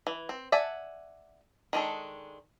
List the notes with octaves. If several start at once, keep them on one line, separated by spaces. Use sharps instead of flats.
E3
C4
D5 E5 F#5 G#5 A5
D#3 G#3 D4 A4